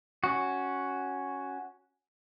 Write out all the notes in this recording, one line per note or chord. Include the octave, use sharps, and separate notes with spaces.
C#4 F#4